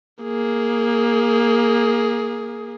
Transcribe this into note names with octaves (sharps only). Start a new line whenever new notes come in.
A#3 G#4